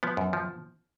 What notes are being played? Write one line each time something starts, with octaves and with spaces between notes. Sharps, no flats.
F3 B3
F#2
F3